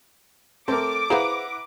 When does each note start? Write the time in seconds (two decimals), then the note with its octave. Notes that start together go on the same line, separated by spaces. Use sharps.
0.68 A3 C4 A4 A#4 D6
1.10 E4 G#4 B4 C5 F5 F#5 A#5